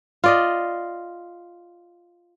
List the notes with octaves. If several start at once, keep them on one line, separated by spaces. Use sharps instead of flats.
F4 D5 D#5